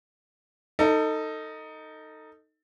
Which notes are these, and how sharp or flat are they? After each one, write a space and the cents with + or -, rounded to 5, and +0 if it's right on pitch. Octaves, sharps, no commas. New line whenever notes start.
D#4 +0 A4 +25